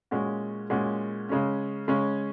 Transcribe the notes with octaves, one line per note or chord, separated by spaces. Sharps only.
A#2 G#3 C#4 F#4
A#2 G#3 C#4 F#4
C#3 G#3 C#4
C#3 G#3 C#4